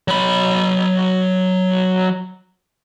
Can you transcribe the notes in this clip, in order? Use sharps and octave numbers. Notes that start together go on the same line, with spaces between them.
F#3 B5